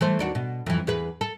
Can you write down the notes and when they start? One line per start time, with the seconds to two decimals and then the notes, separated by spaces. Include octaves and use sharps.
0.01 E3 A3 C5
0.19 D#2 D4 F#4
0.35 B2
0.66 F2 E3
0.87 E2 G#4 B4
1.21 A4